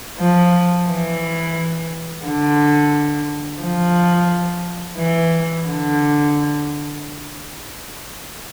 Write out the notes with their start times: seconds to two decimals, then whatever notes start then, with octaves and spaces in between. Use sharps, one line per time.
0.20 F3
0.88 E3
2.25 D3
3.61 F3
4.97 E3
5.67 D3